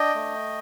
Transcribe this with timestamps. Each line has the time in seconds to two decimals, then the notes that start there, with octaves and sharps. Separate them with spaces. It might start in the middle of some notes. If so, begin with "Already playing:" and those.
Already playing: D4 D#5 G5
0.15 A3